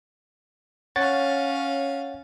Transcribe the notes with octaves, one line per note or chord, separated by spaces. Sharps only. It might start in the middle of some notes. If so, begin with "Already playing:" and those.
C#4 C#5 F5 F#5 A6